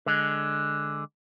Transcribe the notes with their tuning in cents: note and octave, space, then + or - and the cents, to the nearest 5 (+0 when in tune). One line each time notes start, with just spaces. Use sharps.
D3 +0 G#3 +0